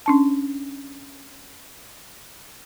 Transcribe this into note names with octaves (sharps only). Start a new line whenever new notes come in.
C#4 D4 A5